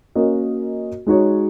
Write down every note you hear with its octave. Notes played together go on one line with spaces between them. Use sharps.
A#3 C#4 F#4 A#4 D#5
G#3 D#4 F#4 C#5